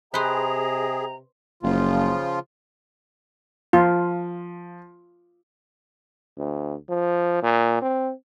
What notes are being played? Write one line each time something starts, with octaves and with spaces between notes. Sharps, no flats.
C3 G#4 B4 C5 D#5 G5 A#5
F#1 C#3 F3 F4
F3 F4
D2
F3
A#2
C4